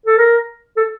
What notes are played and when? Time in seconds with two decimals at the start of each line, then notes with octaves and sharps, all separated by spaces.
0.06 A4
0.18 A#4
0.77 A4